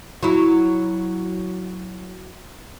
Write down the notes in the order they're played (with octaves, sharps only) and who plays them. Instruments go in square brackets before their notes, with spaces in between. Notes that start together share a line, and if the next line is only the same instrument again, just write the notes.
[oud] F#3 E4